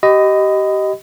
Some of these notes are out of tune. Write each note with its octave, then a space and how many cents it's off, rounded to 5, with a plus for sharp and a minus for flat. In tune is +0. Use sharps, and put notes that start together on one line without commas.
G4 -25 D#5 +0 B5 +25